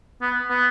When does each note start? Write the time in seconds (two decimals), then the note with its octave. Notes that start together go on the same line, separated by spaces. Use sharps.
0.22 B3
0.50 B3